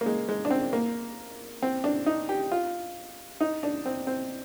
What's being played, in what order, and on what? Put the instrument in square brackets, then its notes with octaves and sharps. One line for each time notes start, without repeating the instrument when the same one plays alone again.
[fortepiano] A#3
G#3
G#3
D4
C4
A#3
C4
D4
D#4
G4
F4
D#4
D4
C4
C4